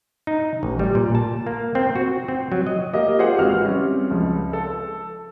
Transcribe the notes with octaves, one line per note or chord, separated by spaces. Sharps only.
D#4
A1
G3
A#2
A5
A#3
C4
F#4
C4
F#3
D#5
A#3 G4 D#5
F4 G4 G#4 C5 F#5
G#1 E3 F#4 F6
G3 C4 C#4
C#2 F3
A4